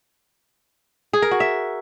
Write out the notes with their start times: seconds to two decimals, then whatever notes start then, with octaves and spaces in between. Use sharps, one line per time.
1.13 G#4
1.22 A#4
1.31 F#4
1.40 E5